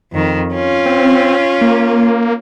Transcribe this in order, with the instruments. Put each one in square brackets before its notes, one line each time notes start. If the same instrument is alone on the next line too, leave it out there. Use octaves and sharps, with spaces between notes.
[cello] F2 D#3
C#4 F4
[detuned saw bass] C4
A#3